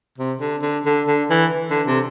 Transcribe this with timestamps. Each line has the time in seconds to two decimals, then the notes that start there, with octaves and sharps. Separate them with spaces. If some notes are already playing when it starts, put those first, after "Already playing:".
0.18 C3
0.40 D3
0.62 D3
0.86 D3
1.07 D3
1.30 E3
1.70 D3
1.87 C3